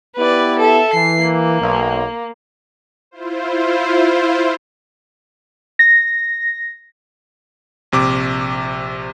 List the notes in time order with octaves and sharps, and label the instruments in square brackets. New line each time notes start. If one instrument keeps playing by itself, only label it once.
[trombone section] B3 E4 G4 [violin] B4 D5
[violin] A4 E5
[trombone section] E3 [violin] C7
[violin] A#3
[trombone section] B1
[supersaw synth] E4 F4 C5
[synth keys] A#6
[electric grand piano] A#1 C3 D6